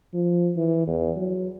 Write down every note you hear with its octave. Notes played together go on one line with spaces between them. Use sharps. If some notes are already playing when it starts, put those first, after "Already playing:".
F3
E3
E2
F#3